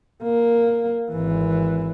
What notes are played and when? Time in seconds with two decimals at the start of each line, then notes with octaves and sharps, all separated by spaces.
0.23 A#3
1.11 G#1 E3